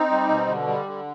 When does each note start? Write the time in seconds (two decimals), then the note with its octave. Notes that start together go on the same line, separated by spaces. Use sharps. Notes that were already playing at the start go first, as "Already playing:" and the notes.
Already playing: C4 D#4
0.09 G3
0.28 B2
0.47 D3
0.67 G3
0.85 D3